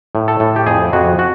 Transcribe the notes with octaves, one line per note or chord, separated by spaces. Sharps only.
A2
A4
A2
G4
F2 G#4
F2 F#4
F#4